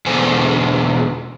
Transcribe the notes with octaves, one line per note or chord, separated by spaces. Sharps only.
E2 B2 D3 D4 C5 G#5